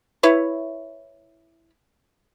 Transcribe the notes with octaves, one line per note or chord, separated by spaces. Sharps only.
E4 B4 C#5